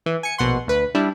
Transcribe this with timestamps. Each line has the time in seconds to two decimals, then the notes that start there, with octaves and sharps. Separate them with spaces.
0.06 E3
0.23 G#5 C#7
0.38 A#1 B2 F#5 C6
0.67 D2 B4
0.95 G3 D4 E4